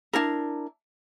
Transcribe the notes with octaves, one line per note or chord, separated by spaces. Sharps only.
D4 E4 A#4